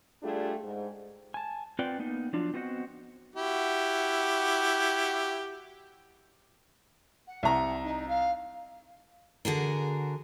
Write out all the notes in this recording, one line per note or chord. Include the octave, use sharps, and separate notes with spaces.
G3 A3 D4 F4 G4 G#4
G#2
G#5 A5
C4 F4 B4 D5 F#5 G5
A#3 B3 D#4
F3 F#3 D4 F4
B3 C4 F#4 C5 D#5 F#5
E4 F#4 G4
F#5
C2 A#5
D#4
F5
D3 F#4 G#4 A#4